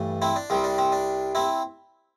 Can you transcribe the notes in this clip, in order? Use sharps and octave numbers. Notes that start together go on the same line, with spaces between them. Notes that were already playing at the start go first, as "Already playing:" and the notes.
Already playing: G2 E3 A3
C4 E4
D4
C2 C3 G3 C4
D4
C4
D4
C4 E4